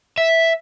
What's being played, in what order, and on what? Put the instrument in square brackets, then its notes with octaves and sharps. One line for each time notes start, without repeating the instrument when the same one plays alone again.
[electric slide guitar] E5